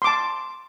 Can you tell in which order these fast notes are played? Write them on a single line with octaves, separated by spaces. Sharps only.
C6 D6 A5